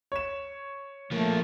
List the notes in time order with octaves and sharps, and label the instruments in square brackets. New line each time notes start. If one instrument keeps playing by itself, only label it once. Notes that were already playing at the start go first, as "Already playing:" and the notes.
[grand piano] C#5 E7
[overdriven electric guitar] F3 A#3 [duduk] A3